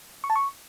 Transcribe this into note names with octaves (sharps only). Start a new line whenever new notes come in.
C#6
A5
C#6